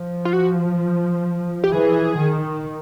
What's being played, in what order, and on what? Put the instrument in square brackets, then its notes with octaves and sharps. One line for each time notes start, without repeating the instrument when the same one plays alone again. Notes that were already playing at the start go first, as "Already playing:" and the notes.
Already playing: [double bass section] F3
[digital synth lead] F4
F#4
G4
[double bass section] E3 [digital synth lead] G#4
[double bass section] D#3